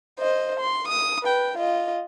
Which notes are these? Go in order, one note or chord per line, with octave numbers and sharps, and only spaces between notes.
C5 D#5
C6
D#6
B4 G5
F4 D#5